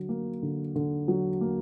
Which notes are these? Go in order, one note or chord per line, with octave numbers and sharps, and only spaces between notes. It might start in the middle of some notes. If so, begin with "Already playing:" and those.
Already playing: D3 F#3
A#3
D3
D3
F#3
A#3